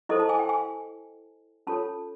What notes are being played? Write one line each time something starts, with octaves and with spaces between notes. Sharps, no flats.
E4 A4 C5 D#5
A5
G#5
G5
G#5
C#4 F4 A4 C#5 A5